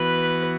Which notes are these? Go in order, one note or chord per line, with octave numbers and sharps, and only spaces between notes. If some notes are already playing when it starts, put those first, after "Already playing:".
Already playing: E3 B3 F#4 B4